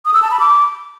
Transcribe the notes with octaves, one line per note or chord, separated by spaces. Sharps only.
D#6
E6
A5
B5
D6